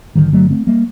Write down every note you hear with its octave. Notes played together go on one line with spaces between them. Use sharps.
G1 F#2 D3 D#3 G3
F#3 A3
A3 C4
G3 A#3